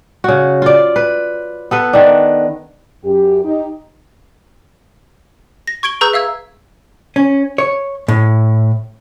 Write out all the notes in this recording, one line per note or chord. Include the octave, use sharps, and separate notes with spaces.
C#3 F#4
F4 D5
B4
B3 A4 B4
D#3 D4
F#2 G4
D#4 G4
A#6
C#6 G#6 D7 G7
G#4 B4 A#5 C#6 E6 G6
E5 F5 E6 G#6
C#4
C#5
A2